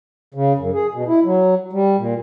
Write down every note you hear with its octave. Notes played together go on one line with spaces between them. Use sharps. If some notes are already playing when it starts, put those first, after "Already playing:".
C#3
F#2
G#4
B2
E4
F#3
G3
A#2